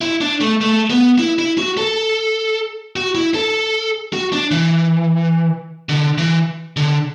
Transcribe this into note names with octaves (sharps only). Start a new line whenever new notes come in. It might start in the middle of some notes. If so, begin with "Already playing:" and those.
E4
D4
A3
A3
B3
E4
E4
F#4
A4
F#4
E4
A4
F#4
D4
E3
D3
E3
D3